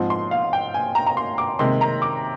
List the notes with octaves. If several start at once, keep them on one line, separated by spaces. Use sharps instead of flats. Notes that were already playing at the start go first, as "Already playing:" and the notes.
Already playing: G#2 F3 C4
C6
F5
G5
G#5
A#5
A#5
C6
D6
C3 D#3 G#3 C6
A#5
D6